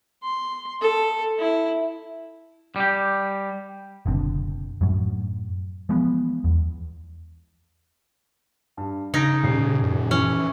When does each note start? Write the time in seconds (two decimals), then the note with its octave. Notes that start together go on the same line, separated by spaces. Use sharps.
0.23 C6
0.82 A4
1.39 E4
2.76 G3 G4
4.06 F#1 B1 D3 C4
4.81 F#2 A2 F#3
5.89 E3 F3 G#3 B3
6.44 E2
8.77 G2
9.14 C#3 D#4 G#6 A#6 D7
9.44 D#1 C7
9.82 F#2
10.11 E3 C#4